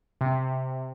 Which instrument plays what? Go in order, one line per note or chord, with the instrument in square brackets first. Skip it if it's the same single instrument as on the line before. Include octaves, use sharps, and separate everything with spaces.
[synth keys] C3